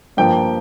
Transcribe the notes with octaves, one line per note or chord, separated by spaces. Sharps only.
G2 F3 A#3 G5